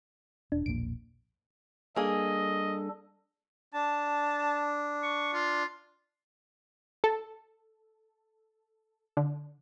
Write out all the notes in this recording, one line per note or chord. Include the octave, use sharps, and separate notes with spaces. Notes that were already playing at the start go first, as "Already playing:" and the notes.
E1 D4
E1 A#1 A#3 D7
G3 A#3 D4 G#4 A4 D#5
D4 A5
C#6
F4
A4
D3